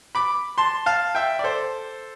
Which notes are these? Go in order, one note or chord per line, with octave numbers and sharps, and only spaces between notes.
B5 D6
A5 C6
F5 A5
E5 G5
D5
A4 C5